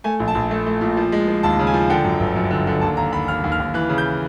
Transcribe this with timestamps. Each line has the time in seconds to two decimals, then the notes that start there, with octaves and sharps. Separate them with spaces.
0.04 A3 G#5
0.20 A#1
0.28 A5
0.35 A#1
0.51 A3
0.66 A3
0.81 A#2
0.97 F3
1.12 G#3
1.28 F3
1.43 D#2 A5
1.59 C#3
1.67 G#5
1.74 F3
1.90 D3 G5
2.04 F#2
2.20 G1
2.36 F#2
2.51 D3
2.67 D3
2.81 D#2 A5
2.97 D#2 A#5
3.12 D#2 B5
3.28 D#2 F6
3.44 D#2
3.52 F6
3.60 D#2
3.74 E3 F#6
3.89 C#3
3.98 G6